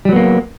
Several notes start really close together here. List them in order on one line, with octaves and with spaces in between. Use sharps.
G3 F#3 B3 A#3